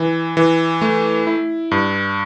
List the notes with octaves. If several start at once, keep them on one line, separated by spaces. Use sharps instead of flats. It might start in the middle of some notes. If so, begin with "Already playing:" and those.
Already playing: E3
E3
A3
E4
G2